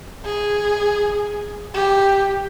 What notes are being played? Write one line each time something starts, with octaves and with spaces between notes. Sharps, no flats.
G#4
G4